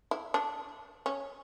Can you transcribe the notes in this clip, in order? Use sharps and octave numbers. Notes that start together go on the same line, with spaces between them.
E4
D4
C#4